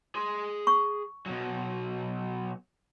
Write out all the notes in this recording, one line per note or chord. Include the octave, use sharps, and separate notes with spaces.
G#4 C6
C#6
B2 F#3